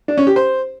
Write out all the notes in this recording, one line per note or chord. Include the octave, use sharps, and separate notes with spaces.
D4
C#4
G4
C5